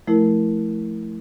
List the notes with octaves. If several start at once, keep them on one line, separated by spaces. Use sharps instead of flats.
F3 A3 E4 A#4